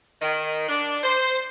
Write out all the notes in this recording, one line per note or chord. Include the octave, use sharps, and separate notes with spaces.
D#3
D4
C5